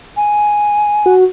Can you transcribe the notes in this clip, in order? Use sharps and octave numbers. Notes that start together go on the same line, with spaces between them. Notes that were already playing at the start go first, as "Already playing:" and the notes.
G#5
F#4